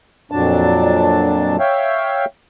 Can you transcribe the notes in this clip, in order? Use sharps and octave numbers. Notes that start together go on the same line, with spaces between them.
F2 A#2 F#3 D4 A5
C#5 E5 F5 G5